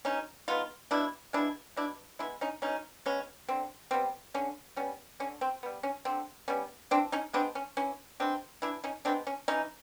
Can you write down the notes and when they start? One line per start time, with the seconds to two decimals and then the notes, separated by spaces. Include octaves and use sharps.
0.05 B2 C#4 D#4
0.48 G#3 B3 D#4 F4
0.91 B2 D4 E4
1.33 G#3 B3 D4 E4
1.76 B2 D4 E4
2.19 G#3 B3 D4 E4
2.41 C#4 D#4
2.62 B2 C#4 D#4
3.06 G#3 B3 C#4
3.48 D3 C4
3.91 G3 B3 C4
4.34 D3 C#4
4.76 G3 B3 C#4
5.20 D3 C#4
5.41 C4
5.63 G3 B3
5.83 C#4
6.05 D3 C4
6.48 G3 B3 C#4
6.91 E3 C4 D4
7.12 C#4 D#4
7.33 G#3 B3 C4 D4
7.55 C#4
7.77 E3 C#4
8.20 G#3 B3 C4 D4
8.62 E3 D4 E4
8.84 C#4 D#4
9.05 G#3 B3 C4 D4
9.27 C#4
9.48 E3 C#4 D#4